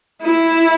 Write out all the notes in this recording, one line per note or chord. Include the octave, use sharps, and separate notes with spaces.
E4